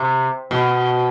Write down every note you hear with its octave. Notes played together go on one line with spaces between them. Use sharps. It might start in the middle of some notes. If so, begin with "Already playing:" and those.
Already playing: C3
B2